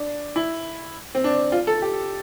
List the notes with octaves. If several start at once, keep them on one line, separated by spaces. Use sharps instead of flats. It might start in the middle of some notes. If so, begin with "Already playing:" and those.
Already playing: D4
E4
C4
D4
F4
A4
G4